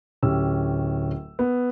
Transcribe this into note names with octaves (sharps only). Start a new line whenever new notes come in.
D1 C#4 G4 E6
B3